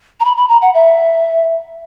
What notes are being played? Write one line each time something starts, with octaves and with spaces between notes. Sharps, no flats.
A#5
B5
B5
A#5
F#5
E5